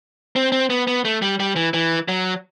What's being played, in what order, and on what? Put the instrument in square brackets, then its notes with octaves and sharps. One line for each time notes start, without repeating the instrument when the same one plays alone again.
[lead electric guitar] C4
C4
B3
B3
A3
G3
G3
E3
E3
F#3